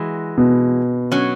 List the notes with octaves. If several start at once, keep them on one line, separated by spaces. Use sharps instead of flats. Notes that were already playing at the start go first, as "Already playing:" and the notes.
Already playing: E3 G#3 F#4
B2
F#3 C#4